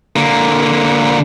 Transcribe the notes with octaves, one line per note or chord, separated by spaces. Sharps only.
D3 A#3